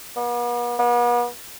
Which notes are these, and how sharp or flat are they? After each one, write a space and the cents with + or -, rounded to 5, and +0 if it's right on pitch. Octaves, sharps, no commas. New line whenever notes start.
B3 -45
B3 -40